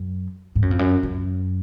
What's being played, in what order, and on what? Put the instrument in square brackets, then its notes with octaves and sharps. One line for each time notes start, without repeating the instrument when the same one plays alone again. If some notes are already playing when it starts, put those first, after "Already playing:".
Already playing: [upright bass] F#2
G#2
F#2
F2
F#2
F#2